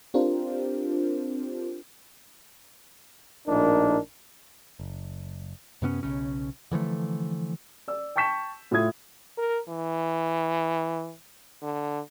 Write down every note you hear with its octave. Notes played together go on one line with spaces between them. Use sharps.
C4 D4 F4 G4 A#4 C5
A#1 A2 D4 D#4 A#4
F#1
F#2 C3 B3 C#4
B1 C#3 C#4
D3 E3 F3 A3
D5 E6
G5 A5 C#6 G6 B6 E7
A2 F4 E5 D#6 G#6
A#4
E3
D3